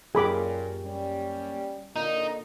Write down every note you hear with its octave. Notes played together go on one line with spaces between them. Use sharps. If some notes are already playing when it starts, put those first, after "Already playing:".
F#2 A#2 A#3 C#4 G4 G#4 B5 D6
G3 C#4
A#2 D3 D#4